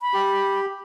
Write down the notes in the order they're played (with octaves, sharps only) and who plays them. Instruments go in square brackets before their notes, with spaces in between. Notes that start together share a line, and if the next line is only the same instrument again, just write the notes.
[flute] B5
[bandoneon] G4